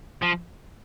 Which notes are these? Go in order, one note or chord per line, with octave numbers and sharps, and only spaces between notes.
F3